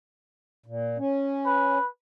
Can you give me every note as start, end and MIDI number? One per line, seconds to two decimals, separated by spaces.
0.66 0.98 46
0.98 1.78 61
1.46 1.87 71